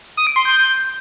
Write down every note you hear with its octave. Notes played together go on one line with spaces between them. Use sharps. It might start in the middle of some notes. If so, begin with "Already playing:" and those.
D#6
D7
C6
G6